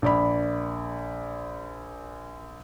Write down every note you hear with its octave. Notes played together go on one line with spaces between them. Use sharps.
A#1 D5 B5